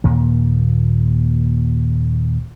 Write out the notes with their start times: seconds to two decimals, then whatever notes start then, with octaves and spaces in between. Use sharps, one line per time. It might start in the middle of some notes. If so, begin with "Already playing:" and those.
0.04 D#2 A#2 A#3